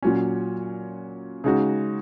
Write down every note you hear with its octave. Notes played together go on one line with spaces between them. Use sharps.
A#2 F#3 C#4
C#3 G#3 D#4 F#4